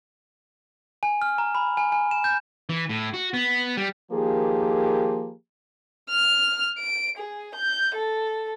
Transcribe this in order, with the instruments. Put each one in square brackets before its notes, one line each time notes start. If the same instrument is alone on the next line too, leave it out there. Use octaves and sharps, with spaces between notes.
[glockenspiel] G#5
F6
A#5
B5
G#5
G#5
E7
G6
[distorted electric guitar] E3
A2
F#4
B3
G3
[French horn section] D#3 F3 A#3 G4 G#4
[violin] F6
D7
G#4
G6
A4